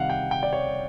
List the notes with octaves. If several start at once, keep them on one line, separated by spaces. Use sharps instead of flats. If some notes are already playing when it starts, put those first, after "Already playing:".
Already playing: C3 D#3 G3 F5 F#5
G5
G5
D5
C#5